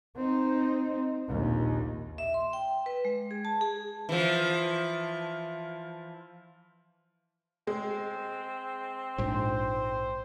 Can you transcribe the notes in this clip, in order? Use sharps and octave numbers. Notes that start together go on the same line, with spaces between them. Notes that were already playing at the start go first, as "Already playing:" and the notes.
C4 D#4
A#1 D#2
E5
C6
G5
B4
G#3
G#4
A5
G#4
E3 F3
G#3 C4
A#1 G#2 C5